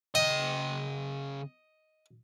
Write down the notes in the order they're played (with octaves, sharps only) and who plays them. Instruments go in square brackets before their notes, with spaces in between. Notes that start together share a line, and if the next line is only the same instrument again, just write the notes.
[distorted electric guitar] C#3 G5 [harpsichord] D#5